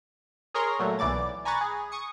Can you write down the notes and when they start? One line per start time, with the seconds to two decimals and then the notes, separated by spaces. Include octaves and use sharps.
0.54 G#4 A#4 C#5 A#5 C6
0.79 A#2 F#3 A3
0.99 B1 E3 D5 D6 A6
1.45 G#5 A#5 B5 C#6 F#6 A6
1.61 G#4
1.92 C#6 D#6 C#7